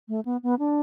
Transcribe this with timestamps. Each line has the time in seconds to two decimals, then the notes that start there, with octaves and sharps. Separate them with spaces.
0.08 A3
0.25 B3
0.43 B3
0.59 D4